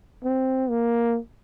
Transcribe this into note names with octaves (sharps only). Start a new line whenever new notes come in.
C4
A#3